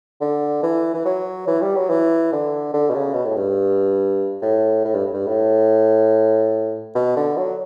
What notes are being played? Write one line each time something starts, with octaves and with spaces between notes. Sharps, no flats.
D3
E3
E3
F#3
E3
G3
F#3
E3
D3
D3
B2
C#3
B2
A2
G2
A2
A2
G2
G2
A2
B2
D3
F#3